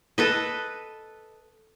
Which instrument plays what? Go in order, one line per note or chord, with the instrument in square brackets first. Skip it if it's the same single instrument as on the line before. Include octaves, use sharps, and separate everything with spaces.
[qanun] A4 B4 D#5